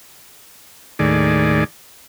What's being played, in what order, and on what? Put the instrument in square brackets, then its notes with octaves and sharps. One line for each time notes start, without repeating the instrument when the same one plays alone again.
[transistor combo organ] D#2 A2 D#3 G#4 D5